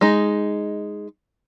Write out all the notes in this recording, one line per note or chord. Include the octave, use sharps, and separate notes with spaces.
G#3 D#4